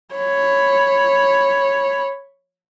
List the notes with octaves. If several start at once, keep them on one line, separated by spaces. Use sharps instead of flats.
C#5 B5